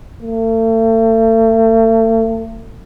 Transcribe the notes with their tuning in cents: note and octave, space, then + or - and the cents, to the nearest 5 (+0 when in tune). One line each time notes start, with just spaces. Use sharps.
A3 +40